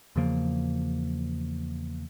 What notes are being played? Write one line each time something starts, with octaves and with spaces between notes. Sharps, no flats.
E2 C#3 F3 A#3